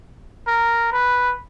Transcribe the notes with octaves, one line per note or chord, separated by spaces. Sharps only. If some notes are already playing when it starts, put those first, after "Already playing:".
A#4
B4